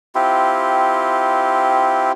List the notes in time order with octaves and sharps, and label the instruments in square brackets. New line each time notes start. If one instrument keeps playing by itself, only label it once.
[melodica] C4 E4 F4 G4